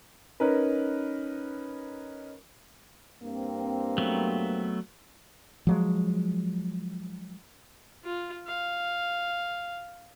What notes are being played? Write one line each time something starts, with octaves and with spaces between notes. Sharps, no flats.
C#4 D#4 A#4 B4
G2 A#3 C4
F#3 A3 B3
F3 F#3 G#3
F4
F5